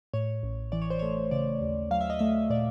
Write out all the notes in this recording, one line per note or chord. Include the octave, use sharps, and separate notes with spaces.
A2 C#5
A1
E3 D5
C#5
C5
A3 C#5
C#3 D5
D#2
F#3 F5
E5
D#5
A3 E5
A#2 D5